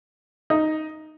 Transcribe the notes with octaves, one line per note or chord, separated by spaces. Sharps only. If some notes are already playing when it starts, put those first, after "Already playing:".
D#4